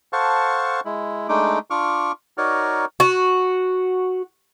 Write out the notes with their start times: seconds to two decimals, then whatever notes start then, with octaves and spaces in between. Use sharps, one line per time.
0.13 A4 C5 F5 F#5 A5 C#6
0.85 G#3 E4
1.29 G#3 A3 D4 D#4 D6
1.70 D4 F4 C#6 D6 F6
2.38 D#4 F#4 A#4 C#5 D5 F6
3.00 F#4